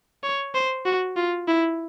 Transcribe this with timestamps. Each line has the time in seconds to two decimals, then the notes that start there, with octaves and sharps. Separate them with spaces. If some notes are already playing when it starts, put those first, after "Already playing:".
0.23 C#5
0.55 C5
0.86 F#4
1.17 F4
1.48 E4